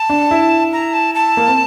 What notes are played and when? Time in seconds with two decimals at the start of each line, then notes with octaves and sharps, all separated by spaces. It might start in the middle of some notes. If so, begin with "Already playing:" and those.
Already playing: A5
0.10 D4
0.31 E4
0.73 A#5
0.93 A5
1.15 A5
1.37 A#3
1.48 C4